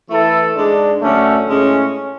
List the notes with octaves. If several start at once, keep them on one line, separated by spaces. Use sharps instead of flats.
E3 A3 E4 A4
G#2 G#3 D4
F#2 D3 A3 C#4
A2 G#3 C#4